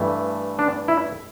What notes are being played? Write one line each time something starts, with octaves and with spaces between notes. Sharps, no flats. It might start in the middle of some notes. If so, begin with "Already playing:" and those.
Already playing: G2 E3 A3
D4
E4